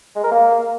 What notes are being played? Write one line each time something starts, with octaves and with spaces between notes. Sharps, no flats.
G#3
A#4
A#3